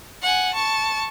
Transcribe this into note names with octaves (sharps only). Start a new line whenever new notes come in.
F#5 G#5
A5 C#6